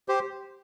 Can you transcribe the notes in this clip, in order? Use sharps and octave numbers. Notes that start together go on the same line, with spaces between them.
G4 C5